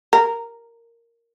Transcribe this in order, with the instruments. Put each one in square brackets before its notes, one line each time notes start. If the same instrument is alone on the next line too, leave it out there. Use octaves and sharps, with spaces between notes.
[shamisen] A#4